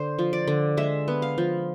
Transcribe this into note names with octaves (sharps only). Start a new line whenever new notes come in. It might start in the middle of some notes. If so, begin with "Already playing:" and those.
Already playing: D3 C5
F3
D5
D3
G#3 E5
B3
F5
F3